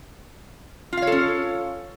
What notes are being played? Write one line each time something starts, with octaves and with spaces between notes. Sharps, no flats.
C#4 F4 A4 C#5 F5